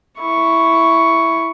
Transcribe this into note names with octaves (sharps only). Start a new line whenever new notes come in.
E4 C#6